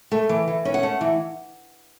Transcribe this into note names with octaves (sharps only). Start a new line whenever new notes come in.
A3
E3
E3
C#4
F#5
A3
E3